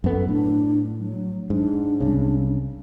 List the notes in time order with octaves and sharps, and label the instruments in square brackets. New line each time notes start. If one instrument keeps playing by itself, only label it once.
[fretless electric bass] F#2 B3 [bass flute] A4
[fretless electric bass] A2 [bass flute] D4
[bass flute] F#3
[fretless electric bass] G#2 [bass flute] D4
[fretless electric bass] C2 C#3